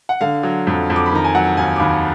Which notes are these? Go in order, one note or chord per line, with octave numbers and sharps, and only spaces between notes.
F#5
D3 F5
F#3
F2
F2
D6
B5
D#3 A#5
G#5
F#3 F#5
D#2 G#5
D6
D#2 B5